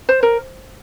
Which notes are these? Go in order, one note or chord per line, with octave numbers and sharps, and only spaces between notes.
C5
A#4